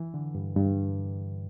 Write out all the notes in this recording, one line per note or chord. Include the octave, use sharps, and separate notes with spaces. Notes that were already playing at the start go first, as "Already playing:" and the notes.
Already playing: E3
D3
G2
G2